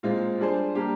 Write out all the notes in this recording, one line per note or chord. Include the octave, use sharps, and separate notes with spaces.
A#2 G#3 C4 F4
G3 D4 G#4 C5
G3 A#3 D4 G4